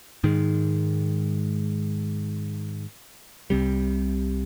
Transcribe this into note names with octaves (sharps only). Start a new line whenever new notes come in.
G#2 D#3 G#3
C2 C3 G3